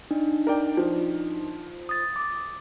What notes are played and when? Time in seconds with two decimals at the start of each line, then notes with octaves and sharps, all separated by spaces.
0.11 D4 D#4
0.47 A#4 D5 G5
0.77 F3
1.89 D#6 A6
2.16 D6